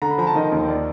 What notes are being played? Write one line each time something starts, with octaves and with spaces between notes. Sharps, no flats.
D3 A#5
B5
F3 A#5
A5
D#3 D#5
D#2
D5